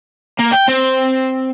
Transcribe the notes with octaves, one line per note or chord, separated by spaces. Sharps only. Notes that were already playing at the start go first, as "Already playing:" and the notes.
A#3
G5
C4